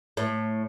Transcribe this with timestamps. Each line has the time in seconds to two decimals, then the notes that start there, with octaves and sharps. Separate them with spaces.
0.17 A2